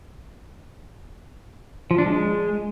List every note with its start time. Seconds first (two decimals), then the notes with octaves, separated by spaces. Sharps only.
1.91 F3
1.98 D4
2.06 G#3